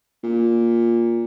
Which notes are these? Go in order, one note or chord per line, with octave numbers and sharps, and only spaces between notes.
A#2